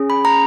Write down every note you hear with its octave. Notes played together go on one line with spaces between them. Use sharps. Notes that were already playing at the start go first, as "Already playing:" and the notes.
Already playing: C#4 G#4
B5
A#5